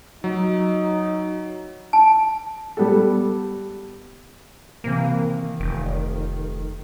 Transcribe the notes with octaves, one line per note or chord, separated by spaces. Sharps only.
F#3 D#4
A5
G3 B3 A4
C3 E3 A#3
D#3
F1